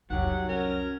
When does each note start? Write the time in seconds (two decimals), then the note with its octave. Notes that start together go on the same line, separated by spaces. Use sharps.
0.10 C2 F2 D#3 F#3 G4 F#5
0.49 C#4 A#4